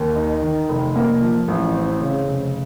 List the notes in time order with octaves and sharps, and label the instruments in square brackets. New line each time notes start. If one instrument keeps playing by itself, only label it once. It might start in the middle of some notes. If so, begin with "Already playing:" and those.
Already playing: [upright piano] D#2
D#4
D#3
F1
A#3
F3
A1
C4
C#3
F1